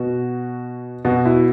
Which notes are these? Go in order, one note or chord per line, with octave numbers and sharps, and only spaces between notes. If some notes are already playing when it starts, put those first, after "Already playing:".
Already playing: B2 F#4
B2 F#4
E4